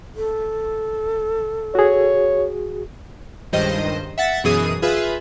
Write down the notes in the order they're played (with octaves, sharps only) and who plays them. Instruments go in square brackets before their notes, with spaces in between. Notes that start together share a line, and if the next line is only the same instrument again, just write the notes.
[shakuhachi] A4
[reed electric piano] F#4 G#4 [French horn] C#5
[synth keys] C#2 G2 D#3 C5 D#5
E5 F#5 A6
F#2 B2 E3 G#4 D#6 D#7
F4 G#4 B4 E5